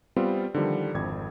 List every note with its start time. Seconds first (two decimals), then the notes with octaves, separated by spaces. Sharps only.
0.16 G3 B3 C4 F4
0.54 D3 D#3 F3 G3
0.94 G#1 F2 G#6